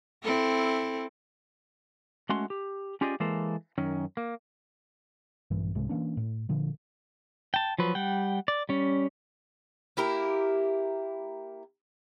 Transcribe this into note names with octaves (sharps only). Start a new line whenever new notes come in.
C4 E4 A4
G#3 A3 C#4 F#4 C6
G4
C#4 F4 G4 G#4 D5 D#5
E3 G#3 A#3 A4 C5
F#2 D#3 C#4
A#3
A#1 G2 E3
C2 G#2 C3 G#3
E3 A#3 C#4 D4
A2
A#2 D3 F3
G5 A5
F3 F#3 B4
G3 F#5 G5
D5
G3 C#4
A#3 E4 G4 A#4